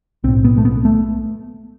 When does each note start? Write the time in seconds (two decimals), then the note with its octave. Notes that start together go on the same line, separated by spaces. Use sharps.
0.24 B1 A2 C4
0.45 B3
0.58 A3
0.65 B3
0.85 A3